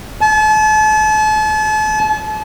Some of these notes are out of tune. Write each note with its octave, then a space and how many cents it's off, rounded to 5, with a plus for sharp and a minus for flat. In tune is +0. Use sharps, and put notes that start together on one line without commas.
A5 -40